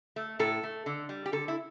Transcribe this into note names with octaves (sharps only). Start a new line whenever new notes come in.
A3
A2 A4
A3
D3
G3
G4
D3 A4
E4